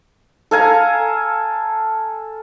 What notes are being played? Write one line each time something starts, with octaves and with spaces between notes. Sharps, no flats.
A4 F5 G#5 A#5